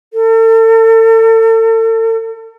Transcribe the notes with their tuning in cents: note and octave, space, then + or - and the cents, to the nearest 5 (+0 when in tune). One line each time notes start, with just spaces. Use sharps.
A4 +40